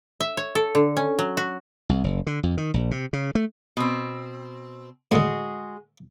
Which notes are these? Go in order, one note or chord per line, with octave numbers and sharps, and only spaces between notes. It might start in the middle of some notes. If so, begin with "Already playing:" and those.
E5
C#5
A4
D3
C#4
F#3
F#4
C2
F#1
D3
F2
D#3
A#1
C3
C#3
A3
B2 C4
A2 D3 G#3 F#4 G#4